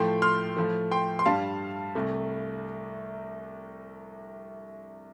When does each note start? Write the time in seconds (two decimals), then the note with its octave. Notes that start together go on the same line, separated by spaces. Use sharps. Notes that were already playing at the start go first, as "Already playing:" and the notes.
Already playing: A2 F3 A3 G5 C6
0.22 C6 F6
0.57 A2 F3 A3
0.91 G5 C6
1.19 C6
1.26 G2 G3 F5 A5
1.95 C2 C3 A3